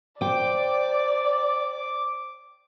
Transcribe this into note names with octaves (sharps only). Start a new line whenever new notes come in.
C5 D5 G5 D6